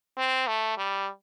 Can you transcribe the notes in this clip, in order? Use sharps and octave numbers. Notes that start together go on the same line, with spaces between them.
C4
A3
G3